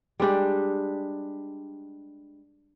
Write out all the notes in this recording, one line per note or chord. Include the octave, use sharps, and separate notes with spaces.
G3 G#3 D4 G4